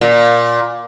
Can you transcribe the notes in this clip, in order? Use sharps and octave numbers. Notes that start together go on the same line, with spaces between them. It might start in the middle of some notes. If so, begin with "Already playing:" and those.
A#2